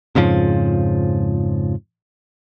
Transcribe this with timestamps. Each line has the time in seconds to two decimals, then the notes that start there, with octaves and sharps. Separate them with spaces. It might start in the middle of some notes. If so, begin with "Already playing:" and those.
0.15 F2 G#2 C#3 F3